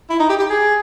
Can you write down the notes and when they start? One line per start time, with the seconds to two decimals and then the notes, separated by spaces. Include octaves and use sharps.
0.10 E4
0.20 D#4
0.30 G4
0.40 G4
0.50 G#4